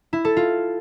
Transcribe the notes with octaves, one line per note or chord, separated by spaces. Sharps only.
E4
A4
F4